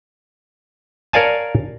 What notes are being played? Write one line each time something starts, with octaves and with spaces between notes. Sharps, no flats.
A#4 C#5 D5 F5 G#5 A5